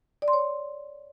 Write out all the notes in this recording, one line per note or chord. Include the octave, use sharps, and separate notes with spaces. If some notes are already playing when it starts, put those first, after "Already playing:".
D5
C6
C#5